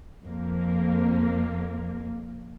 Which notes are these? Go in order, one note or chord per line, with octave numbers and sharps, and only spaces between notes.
F2 A#3